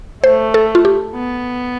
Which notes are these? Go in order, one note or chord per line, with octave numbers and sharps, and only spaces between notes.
A3 C5
A4
F4
G4
B3